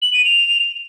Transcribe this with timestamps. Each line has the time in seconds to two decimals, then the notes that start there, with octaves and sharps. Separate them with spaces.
0.02 F#7
0.13 D#7
0.25 F7